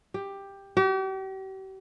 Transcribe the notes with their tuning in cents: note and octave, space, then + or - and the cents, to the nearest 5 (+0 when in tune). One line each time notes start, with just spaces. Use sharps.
G4 +10
G4 -40